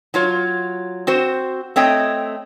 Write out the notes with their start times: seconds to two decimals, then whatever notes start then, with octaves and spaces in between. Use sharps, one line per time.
0.14 F#3 F4 C#5
1.07 C4 F#4 C5
1.76 A3 C4 C#5 D#5 G5